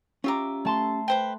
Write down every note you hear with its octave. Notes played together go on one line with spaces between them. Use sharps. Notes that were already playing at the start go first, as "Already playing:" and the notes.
C#4 F4 G4 E5 A#5 D6
A3 A5 C6
B4 C5 G5